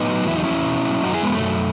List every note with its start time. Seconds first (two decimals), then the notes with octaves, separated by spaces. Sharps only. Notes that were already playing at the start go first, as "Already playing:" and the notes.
Already playing: A2 B3 D#4
0.09 F#3
0.27 E2 E4
0.36 D#4
0.43 E2 C#4 E4
0.66 B2
0.85 F#3
1.03 F#2 D#4 F#4
1.14 E4 G#4
1.23 F#3 G#3 B3
1.33 A3
1.42 F#2